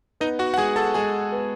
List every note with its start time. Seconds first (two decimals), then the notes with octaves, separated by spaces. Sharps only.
0.20 B3 D#4 D#5
0.39 F#4 F#5
0.54 F#5
0.57 G#3 G#4 G#5
0.76 A4 A5
0.94 G#3 G#4 G#5
1.32 B3